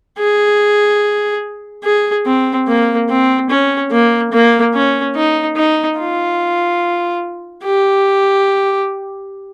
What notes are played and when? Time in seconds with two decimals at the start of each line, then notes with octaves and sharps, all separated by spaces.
0.19 G#4
1.84 G#4
2.26 C4
2.67 A#3
3.09 C4
3.50 C#4
3.92 A#3
4.32 A#3
4.74 C#4
5.15 D#4
5.56 D#4
5.99 F4
7.64 G4